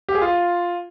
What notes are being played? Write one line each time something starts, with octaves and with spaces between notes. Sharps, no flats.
G4
G#4
F4